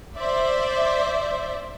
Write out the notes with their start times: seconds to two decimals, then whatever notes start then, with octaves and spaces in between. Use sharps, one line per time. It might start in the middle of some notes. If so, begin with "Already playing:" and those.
0.18 C5 D5 E5